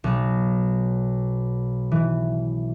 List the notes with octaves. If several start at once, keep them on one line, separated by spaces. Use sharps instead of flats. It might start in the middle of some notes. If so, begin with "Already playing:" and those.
B1
E3